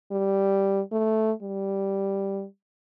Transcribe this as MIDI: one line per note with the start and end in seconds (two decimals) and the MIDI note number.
0.12 0.81 55
0.92 1.32 57
1.42 2.45 55